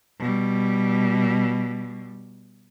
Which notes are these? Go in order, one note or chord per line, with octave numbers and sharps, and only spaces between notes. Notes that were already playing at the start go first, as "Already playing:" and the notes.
B2 G3